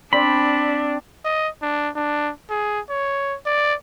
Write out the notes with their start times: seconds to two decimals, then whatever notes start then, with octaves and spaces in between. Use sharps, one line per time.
0.13 C4 D4 D5 B5
1.25 D#5
1.62 D4
1.95 D4
2.50 G#4
2.90 C#5
3.46 D5